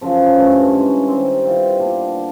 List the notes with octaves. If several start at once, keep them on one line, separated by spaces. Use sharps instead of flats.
F#2 C#3 F3
G2 E3 A3 C#4
E3 G#3 C#4
D#3 G3 C4
E3 G3 C4 F4
A#2 G3 B3 D4
D3